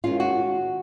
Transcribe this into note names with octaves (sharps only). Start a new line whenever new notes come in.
D#3 G#3 C#4 F4
F#4